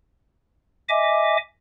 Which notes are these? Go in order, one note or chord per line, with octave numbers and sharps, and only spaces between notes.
D#5 E5 G#5 D6